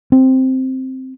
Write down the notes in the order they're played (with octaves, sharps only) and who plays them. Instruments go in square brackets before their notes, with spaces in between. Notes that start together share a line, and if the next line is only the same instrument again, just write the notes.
[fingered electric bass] C4